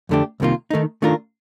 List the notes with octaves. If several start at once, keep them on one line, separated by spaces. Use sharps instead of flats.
F2 D3 A3 D4 G4
C2 C3 D#3 A#3 F4
D#3 A3 D#4
D#3 A3 D4 F4 A#4